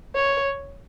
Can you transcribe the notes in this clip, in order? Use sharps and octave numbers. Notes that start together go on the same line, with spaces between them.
C#5